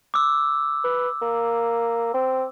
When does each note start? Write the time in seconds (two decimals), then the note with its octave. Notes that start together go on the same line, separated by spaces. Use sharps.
0.14 D6 E6
0.84 B4
1.22 A#3
2.14 C4